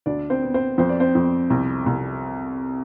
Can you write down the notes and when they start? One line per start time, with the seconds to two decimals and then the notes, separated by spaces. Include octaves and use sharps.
0.06 D2 D4 D5
0.30 C4 C5
0.42 B3
0.54 C4 C5
0.78 F2 C5
0.89 D5
1.00 C4 C5
1.15 F2
1.50 C2
1.86 C2